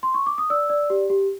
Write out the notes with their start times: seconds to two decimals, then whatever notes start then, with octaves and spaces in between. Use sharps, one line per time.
0.03 C6
0.14 C#6
0.26 D6
0.38 D#6
0.50 D5 E6
0.70 D5
0.90 G4
1.10 G4